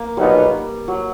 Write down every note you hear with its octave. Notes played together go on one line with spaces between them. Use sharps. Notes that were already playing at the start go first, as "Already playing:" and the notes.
Already playing: A#3
B1 A#2 F#3 G3 B3 D#4
F#3